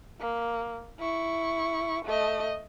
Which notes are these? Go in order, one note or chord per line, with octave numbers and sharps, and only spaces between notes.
A#3
E4 C#6
A3 D#5